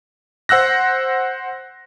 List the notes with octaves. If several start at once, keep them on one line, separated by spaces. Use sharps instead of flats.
C5 F#5 E6 F#6 A#6